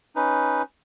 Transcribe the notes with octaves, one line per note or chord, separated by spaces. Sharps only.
C#4 D#4 B4